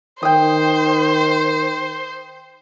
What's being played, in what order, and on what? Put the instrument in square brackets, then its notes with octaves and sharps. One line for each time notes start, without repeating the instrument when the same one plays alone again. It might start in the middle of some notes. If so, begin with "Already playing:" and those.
[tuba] D#3 [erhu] C5 [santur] G5 D#6